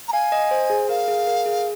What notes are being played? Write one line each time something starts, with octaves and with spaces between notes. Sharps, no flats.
A#5
F5 G#5
D#5
C5
G#4
A#4 F5
G#4
A#4
G#4